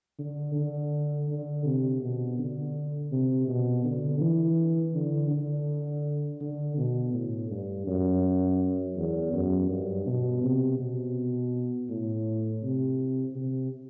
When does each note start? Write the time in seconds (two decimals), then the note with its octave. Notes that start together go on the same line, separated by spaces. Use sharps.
0.19 D3
0.56 D3
1.28 D3
1.65 C3
2.02 B2
2.38 D3
3.12 C3
3.48 B2
3.85 D3
4.21 E3
4.95 D3
5.31 D3
6.41 D3
6.78 B2
7.14 A2
7.50 G2
7.87 F#2
8.97 E2
9.33 F#2
9.70 G2
10.07 B2
10.44 C3
10.80 B2
11.90 A2
12.63 C3
13.36 C3